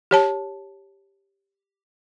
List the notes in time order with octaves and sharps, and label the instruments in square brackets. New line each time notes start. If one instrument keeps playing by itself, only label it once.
[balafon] G4 C#5 A5